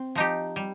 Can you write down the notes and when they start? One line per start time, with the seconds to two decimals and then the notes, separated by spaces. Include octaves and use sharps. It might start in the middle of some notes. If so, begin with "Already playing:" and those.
Already playing: C4
0.15 F3 D#4 G4
0.56 G3